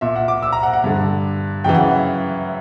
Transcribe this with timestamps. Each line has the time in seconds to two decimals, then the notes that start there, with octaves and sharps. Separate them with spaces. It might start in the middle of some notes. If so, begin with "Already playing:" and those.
0.01 A#2 E5
0.16 F#5
0.28 D6
0.42 E6
0.52 A#5
0.63 F#5
0.73 F#5
0.84 G2 D3
1.64 F#2 C#3 E3 G5
1.75 F#5